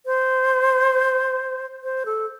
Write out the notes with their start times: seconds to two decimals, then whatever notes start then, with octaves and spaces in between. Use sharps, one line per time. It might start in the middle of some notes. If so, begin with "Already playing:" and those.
0.06 C5
1.83 C5
2.06 A4